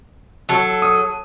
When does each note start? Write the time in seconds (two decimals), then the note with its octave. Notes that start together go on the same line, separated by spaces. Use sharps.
0.49 F#3 A4
0.82 D#6